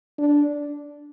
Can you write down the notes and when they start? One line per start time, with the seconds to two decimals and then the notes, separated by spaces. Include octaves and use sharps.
0.18 D4